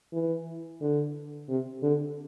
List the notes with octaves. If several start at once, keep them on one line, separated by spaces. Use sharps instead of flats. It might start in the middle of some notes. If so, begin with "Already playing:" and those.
E3
D3
C3
D3